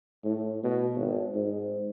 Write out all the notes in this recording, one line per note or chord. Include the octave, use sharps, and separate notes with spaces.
A2
B2
G#1
G#2